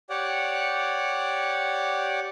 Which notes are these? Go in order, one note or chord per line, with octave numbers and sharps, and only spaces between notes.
G4 C#5 D5 F#5